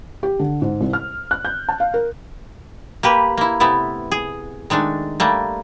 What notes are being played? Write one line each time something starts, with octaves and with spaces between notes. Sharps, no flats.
G4
D3
G#2
C2
F6
F#6
G6
A5
F5
A#4
A#3 G4 B4
A#3 E4
C3 A3 B3 E4
G#4
D#3 G#3 A3 D4
G3 A3 A#3